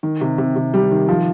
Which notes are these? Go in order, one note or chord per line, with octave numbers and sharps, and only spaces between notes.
D#3
C3
C3
C3
G3
D#3
F3